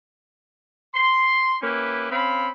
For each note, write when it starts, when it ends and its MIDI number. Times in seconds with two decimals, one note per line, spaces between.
0.94 1.55 84
1.62 2.09 58
1.62 2.09 61
1.62 2.09 64
1.62 2.09 67
1.62 2.09 71
2.11 2.49 60
2.11 2.49 61
2.11 2.49 77
2.11 2.49 83